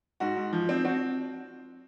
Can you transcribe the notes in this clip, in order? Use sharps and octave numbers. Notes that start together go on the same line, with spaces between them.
G#2 F#4
G#2
F3
C4
C4 F#4